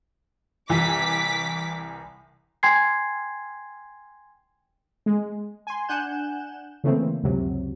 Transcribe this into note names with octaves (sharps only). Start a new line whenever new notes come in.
C2 E3 D6 B6
G5 G#5 C6 G#6 C7
G#3
G#5 C6
D4 F#5 G#5 F#6 G6 E7
C#3 E3 A3 A#3 C4
C#2 F#2 C3 F#3